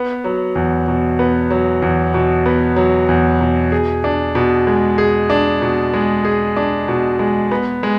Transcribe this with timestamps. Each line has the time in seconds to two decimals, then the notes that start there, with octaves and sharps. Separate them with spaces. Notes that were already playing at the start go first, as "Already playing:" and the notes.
Already playing: B3
0.24 F#3
0.55 E2
0.88 B2
1.19 B3
1.51 F#3
1.82 E2
2.14 B2
2.46 B3
2.76 F#3
3.08 E2
3.41 B2
3.72 G#4
4.04 D4
4.35 B2
4.67 G#3
4.98 G#4
5.30 D4
5.62 B2
5.94 G#3
6.25 G#4
6.57 D4
6.88 B2
7.19 G#3
7.51 B3
7.83 G#3